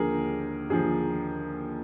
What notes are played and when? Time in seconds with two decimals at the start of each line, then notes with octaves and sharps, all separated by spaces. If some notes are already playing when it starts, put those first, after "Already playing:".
Already playing: D#2 D3 F3 G#4 A#4
0.70 D#2 D3 F3 G#4